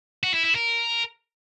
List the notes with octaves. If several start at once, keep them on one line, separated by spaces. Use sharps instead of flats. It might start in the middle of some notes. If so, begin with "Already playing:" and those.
F#4
E4
E4
A#4